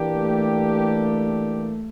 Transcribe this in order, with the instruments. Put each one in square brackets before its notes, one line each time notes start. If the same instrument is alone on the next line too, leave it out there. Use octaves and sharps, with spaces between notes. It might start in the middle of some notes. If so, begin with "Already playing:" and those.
Already playing: [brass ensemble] E3 A#3 D4 G4
[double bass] A3